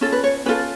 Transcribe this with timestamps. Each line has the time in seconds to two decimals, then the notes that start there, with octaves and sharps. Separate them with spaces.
0.01 C#4 F4 A4
0.12 B4
0.24 C#5
0.46 C#4 F4 A4 B4